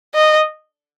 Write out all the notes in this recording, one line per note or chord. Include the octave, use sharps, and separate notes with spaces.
D#5